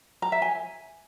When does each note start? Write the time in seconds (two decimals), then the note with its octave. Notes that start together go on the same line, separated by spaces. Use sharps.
0.22 A#5
0.32 E5
0.42 G#5